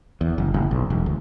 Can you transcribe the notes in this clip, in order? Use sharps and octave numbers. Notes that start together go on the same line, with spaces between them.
E2
F#1
F#1
B1
E1
D2